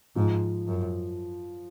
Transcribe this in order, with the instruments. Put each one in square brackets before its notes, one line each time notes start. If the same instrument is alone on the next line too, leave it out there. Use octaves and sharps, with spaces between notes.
[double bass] G#2 [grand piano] F3
[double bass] F#2